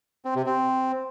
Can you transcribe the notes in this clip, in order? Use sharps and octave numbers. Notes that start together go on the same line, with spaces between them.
C4
C3
C4